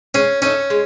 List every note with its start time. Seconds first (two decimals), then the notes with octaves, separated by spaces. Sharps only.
0.15 G#3 C#4
0.42 C#4 D#4 A4 E5
0.70 G#3